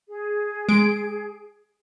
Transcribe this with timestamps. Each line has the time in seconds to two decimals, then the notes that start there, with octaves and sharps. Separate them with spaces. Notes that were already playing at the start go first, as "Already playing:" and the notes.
0.09 G#4
0.69 G#3 D7